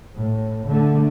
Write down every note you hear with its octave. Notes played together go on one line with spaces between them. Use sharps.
A2
D3 A3